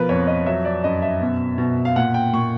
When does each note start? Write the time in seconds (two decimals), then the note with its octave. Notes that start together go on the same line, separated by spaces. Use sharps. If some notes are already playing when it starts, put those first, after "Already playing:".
Already playing: B2 F3 A#4 B4
0.09 F2 C#5
0.27 D#5
0.46 F#3 E5
0.65 D5
0.84 F#2 D#5
1.02 E5
1.21 B2
1.58 B2
1.85 F5
1.96 A#2 F#5
2.14 G5
2.33 A#2 C#6